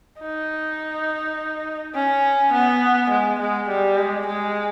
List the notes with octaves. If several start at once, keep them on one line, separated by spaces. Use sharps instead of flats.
D#4
C#4
B3
G#3
G#3
G3
G#3
G#3